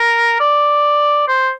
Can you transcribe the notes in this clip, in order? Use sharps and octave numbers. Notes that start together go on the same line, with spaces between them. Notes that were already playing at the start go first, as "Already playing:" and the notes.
Already playing: A#4
D5
C5